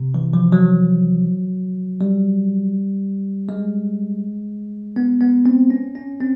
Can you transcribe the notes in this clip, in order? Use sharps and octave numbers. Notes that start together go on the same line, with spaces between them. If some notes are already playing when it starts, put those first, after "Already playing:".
Already playing: C3
E3
F3
F#3
G3
G#3
B3
B3
C4
C#4
C#4
C4